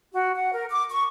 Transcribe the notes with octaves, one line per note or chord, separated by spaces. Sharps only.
F#4
F#5
A#4
D6
C#6